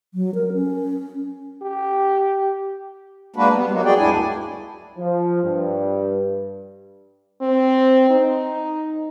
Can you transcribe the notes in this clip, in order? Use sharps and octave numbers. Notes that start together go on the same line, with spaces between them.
F#3
A#4
C#4
G4
G#3 A#3 D4 F#4 B4
G3 B3
F#3 A#3 D#4 F#4
F#4 G#4 D5 G5
D2 G2 G#3 D4 E4 G#5
F3
G2
C4
D#4